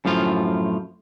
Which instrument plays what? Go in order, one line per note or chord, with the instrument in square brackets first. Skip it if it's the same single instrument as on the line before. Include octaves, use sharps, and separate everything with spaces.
[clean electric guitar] F#2 A2 F3 F4